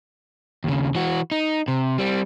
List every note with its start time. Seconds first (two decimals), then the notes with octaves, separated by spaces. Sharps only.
0.64 D#2 C#3
0.95 E3 F#4
1.32 D#4
1.68 C3
1.98 G3 C4